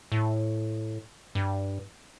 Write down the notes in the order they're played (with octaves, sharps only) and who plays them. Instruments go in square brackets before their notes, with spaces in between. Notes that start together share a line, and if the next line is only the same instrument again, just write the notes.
[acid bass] A2
G2